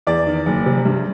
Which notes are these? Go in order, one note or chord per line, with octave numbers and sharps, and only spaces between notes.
E2 D5
D#3
F#1
C3
G2